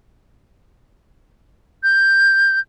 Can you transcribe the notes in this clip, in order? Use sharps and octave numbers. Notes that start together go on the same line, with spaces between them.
G6